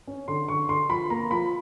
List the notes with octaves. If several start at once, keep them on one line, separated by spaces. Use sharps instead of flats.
C#4
D3 C6
D3 C#6
D3 C6
F3 B5
A#3 A#5
F3 B5